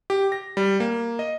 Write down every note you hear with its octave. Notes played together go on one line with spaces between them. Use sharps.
G4
A#6
G3
A#3
D#5